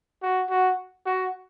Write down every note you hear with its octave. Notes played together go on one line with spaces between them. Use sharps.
F#4
F#4
F#4